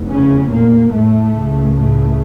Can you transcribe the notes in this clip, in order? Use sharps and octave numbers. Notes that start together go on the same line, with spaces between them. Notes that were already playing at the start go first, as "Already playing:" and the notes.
Already playing: F1 E2
C#3 C#4
A#2 A#3
A2 A3
C#2 C#3
A2 A3